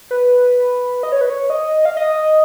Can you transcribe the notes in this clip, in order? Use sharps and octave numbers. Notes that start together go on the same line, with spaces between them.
B4
D#5
C#5
B4
C#5
D#5
F5
D#5